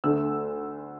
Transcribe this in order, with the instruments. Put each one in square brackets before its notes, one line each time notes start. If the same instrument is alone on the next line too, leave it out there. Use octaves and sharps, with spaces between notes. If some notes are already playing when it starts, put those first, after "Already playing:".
[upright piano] D2 D3 A3 E6